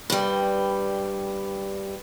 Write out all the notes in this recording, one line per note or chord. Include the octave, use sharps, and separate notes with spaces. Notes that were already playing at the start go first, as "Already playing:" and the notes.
G2 G3 B4